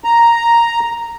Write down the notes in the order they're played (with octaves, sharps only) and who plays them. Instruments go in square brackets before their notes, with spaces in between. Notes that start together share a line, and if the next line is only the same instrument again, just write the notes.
[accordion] A#5